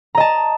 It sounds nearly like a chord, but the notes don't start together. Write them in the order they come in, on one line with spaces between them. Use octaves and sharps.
A#5 D#5 A5